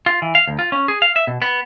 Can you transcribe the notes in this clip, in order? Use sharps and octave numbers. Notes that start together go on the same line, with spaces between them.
F4
E3
F5
D2
F4
C#4
G#4
F5
E5
B2
B3